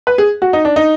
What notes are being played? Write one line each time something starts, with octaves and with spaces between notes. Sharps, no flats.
B4
G#4
F#4
D#4
D4
D#4